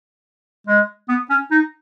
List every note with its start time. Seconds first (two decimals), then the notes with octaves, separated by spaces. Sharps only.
0.67 G#3
1.09 B3
1.29 C#4
1.51 D#4